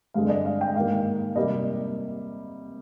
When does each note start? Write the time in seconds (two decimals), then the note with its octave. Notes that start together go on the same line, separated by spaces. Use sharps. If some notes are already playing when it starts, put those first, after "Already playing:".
0.14 G2 D3 G#3 C4 F5
0.26 D5
0.30 D#5
0.45 F5
0.61 G5
0.75 G#2 D#3 A#3 F5
1.36 C3 G3 A#3 D#5